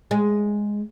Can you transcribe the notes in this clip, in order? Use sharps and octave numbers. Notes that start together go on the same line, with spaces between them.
G#3